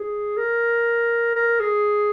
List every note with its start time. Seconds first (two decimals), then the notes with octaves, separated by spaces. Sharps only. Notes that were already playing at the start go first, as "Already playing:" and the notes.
Already playing: G#4
0.37 A#4
1.35 A#4
1.60 G#4